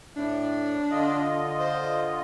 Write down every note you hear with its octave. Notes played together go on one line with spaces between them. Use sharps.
A2 A3 D4
D3 F4 D#5
C5